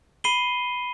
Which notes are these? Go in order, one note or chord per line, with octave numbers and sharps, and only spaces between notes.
B5 C7 D#7 G7